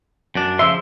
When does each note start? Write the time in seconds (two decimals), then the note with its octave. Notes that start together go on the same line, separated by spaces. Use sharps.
0.35 F#2 D4
0.59 C#3 F3 E5 C6